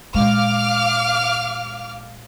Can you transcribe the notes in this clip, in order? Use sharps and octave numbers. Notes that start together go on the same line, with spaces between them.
A#2 G#3 F5 D6 F6